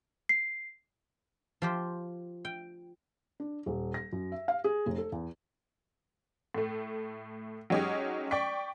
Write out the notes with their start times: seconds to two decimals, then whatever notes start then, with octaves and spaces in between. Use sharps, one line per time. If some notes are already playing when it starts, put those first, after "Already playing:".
0.29 C7
1.62 F3 G4 C5
2.45 G5
3.40 D4
3.66 D#1
3.94 A#6
4.12 F#2
4.32 E5
4.48 F5
4.64 G#4
4.86 F1
4.98 A4
5.12 E2
6.55 A2 A3
7.70 F#3 G#3 C#4 D#4 G4
8.31 D5 G5 C#6 B6